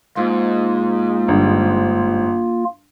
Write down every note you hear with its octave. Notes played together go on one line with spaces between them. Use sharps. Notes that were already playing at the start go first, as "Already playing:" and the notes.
G#2 A#3 F4
G1